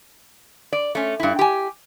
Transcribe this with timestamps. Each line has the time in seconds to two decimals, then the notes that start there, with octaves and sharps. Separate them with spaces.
0.72 D5
0.95 A3 C#4
1.20 G2 E4
1.39 G4 G#5